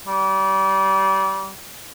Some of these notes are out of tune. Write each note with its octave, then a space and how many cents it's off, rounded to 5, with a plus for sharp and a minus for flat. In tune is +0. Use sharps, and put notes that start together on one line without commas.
G3 -30